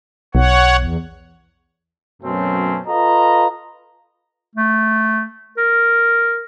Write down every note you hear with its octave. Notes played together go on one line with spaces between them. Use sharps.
B1 C#5 F#5
E2
F#2 B2 F#3 A3 C4 C#4
F4 A4 B4 D#5 A#5
A3
A#4